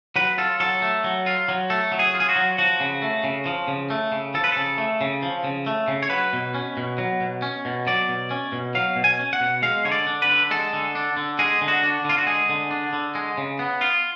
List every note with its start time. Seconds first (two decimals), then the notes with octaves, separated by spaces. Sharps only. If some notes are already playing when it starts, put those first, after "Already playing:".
0.16 F#3 B4
0.38 F4 A4
0.60 F#3 A4
0.82 A3
1.04 F#3
1.26 F4
1.49 F#3
1.70 A3 A4
1.92 F#3
1.99 G#4
2.14 F4
2.20 G#4
2.29 F#4
2.36 F#3
2.58 F3 F#4
2.80 C#3
3.02 A3
3.24 C#3
3.46 F3
3.68 C#3
3.90 A3
4.12 C#3
4.34 F3 A4
4.44 B4
4.52 C#3 A4
4.78 A3
5.01 C#3
5.22 F3
5.44 C#3
5.66 A3
5.88 C#3
6.03 C#5
6.10 F#3 B4
6.33 B2
6.54 C#4
6.77 B2
6.98 F#3
7.20 B2
7.42 C#4
7.65 B2
7.87 F#3 D5
8.08 B2
8.31 C#4
8.52 B2
8.75 F#3 F5
8.96 B2
9.04 G#5
9.19 C#4
9.33 F#5
9.40 B2
9.62 G#3 F5
9.85 D3 C#5
9.91 D5
10.06 D4
10.22 B4
10.29 D3
10.51 G#3 A4
10.73 D3
10.95 D4
11.17 D3
11.39 G#3 G#4
11.61 D3
11.68 F#4
11.83 D4
12.04 D3 F4
12.18 F#4
12.27 G#3 G#4
12.49 D3
12.71 D4
12.93 D3
13.15 G#3
13.37 C#3
13.59 B3
13.81 F4